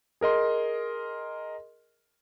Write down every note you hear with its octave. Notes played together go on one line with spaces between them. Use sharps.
G#4 A#4 D#5 C6